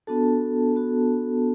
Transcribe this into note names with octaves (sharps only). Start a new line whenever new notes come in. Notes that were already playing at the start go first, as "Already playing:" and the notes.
B3 D4 F#4 A4 A5
B3 D4 F#4